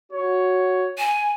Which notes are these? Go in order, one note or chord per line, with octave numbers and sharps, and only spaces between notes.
F#4 C#5
G#5